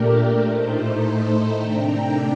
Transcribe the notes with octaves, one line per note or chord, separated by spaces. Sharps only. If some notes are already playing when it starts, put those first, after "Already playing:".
Already playing: A#2 A3 D4 G4 A#4
A2 A3 D#4 A4 C5
C3 D#3 A3 D4 G5 A#5